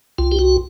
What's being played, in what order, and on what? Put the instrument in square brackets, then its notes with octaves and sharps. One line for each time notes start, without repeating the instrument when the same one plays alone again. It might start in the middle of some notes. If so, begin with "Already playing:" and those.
[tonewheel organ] C2 F4
G4
F#4